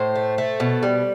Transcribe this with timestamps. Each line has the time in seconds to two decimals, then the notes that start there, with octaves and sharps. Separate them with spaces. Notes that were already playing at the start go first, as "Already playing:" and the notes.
Already playing: A2 C5
0.15 A3
0.38 A3
0.60 B2
0.83 G3